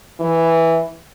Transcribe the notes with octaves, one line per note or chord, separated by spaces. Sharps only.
E3